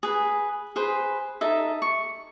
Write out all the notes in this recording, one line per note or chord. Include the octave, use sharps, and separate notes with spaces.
G#4 B4
G#4 B4 C5
D#4 A4 E5
C#6